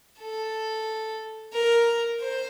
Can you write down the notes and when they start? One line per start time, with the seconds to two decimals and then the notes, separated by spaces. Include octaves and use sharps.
0.19 A4
1.53 A#4
2.20 C5